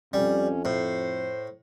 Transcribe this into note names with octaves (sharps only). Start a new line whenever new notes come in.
F2 G3 C#4
A2 C5